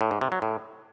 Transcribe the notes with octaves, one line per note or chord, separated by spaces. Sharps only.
A2
G#2
C3
F#3
A2